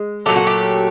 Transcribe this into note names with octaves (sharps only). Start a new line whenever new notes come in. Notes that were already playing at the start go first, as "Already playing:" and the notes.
Already playing: G#3
A#2 F#3 A3 G4
F#4
G4